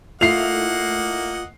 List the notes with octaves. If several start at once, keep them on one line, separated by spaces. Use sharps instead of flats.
A3 A#3 E4 F4 D#5 F#5 C7 F7